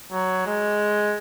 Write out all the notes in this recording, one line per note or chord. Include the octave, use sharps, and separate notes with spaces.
F#3
G#3